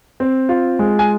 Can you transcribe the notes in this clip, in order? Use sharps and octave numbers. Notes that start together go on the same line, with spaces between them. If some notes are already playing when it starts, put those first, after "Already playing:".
C4
F4
G#3
G#5